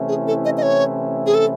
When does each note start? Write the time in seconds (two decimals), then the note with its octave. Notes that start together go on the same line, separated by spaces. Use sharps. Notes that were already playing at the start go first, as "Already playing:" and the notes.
Already playing: C3 E3 A3 C#4 E4
0.08 G#4
0.27 A4
0.45 D#5
0.57 D#5
0.63 C#5
1.26 G#4
1.34 A4